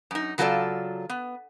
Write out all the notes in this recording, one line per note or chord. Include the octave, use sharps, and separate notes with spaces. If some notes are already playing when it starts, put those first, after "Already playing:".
F#2 D#4
C#3 F#3 F4 G#4 A4 D5
B3